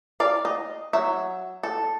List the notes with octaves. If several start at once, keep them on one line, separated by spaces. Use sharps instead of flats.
D5 F5
D#5
F#3 E5
A4